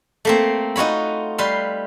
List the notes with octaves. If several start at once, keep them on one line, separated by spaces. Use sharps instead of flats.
A3 A#3 C4
D#4 F4 F#4 C#5 B5
G3 B4 F5 C6